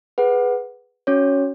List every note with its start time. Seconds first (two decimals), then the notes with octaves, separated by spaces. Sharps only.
0.18 G#4 B4 F#5
1.07 C#4 F#4 C#5